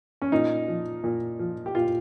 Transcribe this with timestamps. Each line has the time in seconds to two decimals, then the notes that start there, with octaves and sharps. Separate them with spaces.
0.22 C#4
0.32 A#2 D#4
0.68 F3
1.04 A#2
1.39 F3
1.66 G4
1.75 A#2 F4